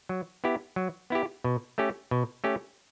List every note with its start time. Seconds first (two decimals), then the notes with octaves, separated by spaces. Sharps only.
0.09 F#3
0.44 B3 E4 G4
0.76 F#3
1.10 B3 E4 G4
1.44 B2
1.78 A3 C#4 G4
2.11 B2
2.44 A3 C#4 G4